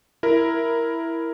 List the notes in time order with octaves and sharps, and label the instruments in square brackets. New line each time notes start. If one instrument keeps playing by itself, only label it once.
[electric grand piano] E4 A#4